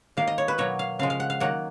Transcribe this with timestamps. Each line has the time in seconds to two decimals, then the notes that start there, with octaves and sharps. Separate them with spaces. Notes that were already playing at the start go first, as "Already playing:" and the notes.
0.17 D#3 A#3 F5
0.27 D#5
0.38 C#5
0.48 B4
0.58 B2 F#3 A#3 C#5
0.79 F5
0.99 C#3 F3 G#3 F5
1.10 F5
1.20 F#5
1.30 F5
1.40 D#3 F#3 A#3 F#5